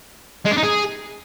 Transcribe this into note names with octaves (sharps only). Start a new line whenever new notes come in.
G#3
D4
D#4
G#4